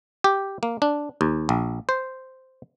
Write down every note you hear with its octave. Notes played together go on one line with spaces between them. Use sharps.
G4
A#3
D4
D#2
A#1
C5